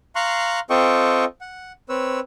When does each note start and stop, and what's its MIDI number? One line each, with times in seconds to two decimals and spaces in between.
0.16 0.60 77
0.16 0.60 82
0.16 0.60 84
0.16 0.60 85
0.16 0.60 90
0.70 1.25 60
0.70 1.25 65
0.70 1.25 69
0.70 1.25 75
0.70 1.25 79
0.70 1.25 85
1.41 1.72 78
1.89 2.20 60
1.89 2.20 71
1.89 2.20 73
1.89 2.20 88